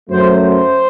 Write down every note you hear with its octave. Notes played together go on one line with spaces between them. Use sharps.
F#2 F#3 A3 C5
C5